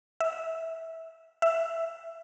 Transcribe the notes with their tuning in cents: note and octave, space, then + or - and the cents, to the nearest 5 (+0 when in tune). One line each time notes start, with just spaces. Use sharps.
E5 -20
E5 +5